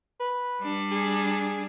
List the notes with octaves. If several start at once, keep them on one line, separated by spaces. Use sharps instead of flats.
B4
G3 D4
G#4